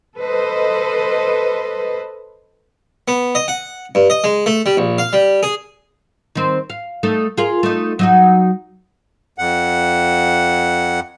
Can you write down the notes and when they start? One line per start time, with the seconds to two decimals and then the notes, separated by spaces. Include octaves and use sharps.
0.18 A4 B4 C5 D#5
3.08 B3
3.35 D#5
3.48 F#5
3.95 G2
4.10 D#5
4.24 G#3
4.46 A3
4.66 G3
4.77 A#1
4.98 F5
5.13 G3
5.43 G#4
6.35 D#3 C4
6.70 F5
7.03 A3 D#4 A4
7.37 F4 G#4 A#4
7.63 A3 D#4
7.99 F#3 D#4 F#4
9.38 F2 F#5